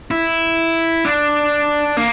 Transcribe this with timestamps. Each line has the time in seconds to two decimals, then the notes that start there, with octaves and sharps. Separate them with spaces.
0.11 E4
1.05 D4
1.97 A#3